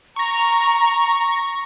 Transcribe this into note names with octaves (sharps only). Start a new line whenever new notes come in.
A#5 C#6 A#6